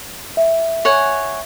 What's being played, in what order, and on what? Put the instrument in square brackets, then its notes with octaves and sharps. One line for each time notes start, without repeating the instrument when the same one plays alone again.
[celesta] E5
[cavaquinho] C#5 F#5 G#5